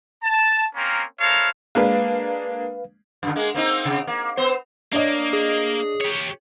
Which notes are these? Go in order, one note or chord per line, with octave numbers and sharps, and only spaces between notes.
A5
A#3 C4 C#4 A#4
E4 A4 A#4 C5 C#5 F5
G#3 A#3 D4 B4 F5
F#2 D3
G#3 A#3
A#3 C4 D#4
C3
A#3
B3 C5
A#3 D4 C#5 D#5
G#4
G4 C#5